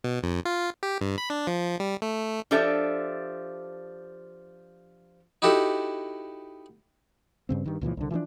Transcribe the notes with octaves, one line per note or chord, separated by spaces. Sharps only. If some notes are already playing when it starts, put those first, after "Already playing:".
B2
F2
F4
G4
G2
B5
D4
F3
G3
A3
F3 D4 G4 A4 D5 E5
D#4 E4 F#4 G4 A4
G2 C#3 C4
G2 D#3
C#2 A#2 E3 F3
C2 D3
E3 F3 G#3 D4